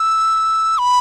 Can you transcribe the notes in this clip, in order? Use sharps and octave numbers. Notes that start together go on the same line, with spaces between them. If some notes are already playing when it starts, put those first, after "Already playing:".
Already playing: E6
B5